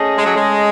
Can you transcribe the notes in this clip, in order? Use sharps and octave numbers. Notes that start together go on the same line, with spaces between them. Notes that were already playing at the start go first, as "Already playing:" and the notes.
Already playing: A3 C#4 G#4 D#5
G#3
F#3
G#3